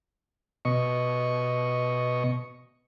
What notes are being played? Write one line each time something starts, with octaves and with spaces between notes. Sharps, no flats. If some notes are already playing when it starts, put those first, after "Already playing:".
B2 D#5 C#6